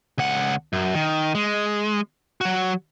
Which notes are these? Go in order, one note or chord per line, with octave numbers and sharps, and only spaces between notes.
C#2 F#5
F#2
D#3
G#3
F#3 F#4